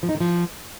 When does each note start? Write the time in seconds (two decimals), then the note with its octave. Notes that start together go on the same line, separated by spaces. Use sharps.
0.03 F3
0.09 D#4
0.15 D#3
0.20 F3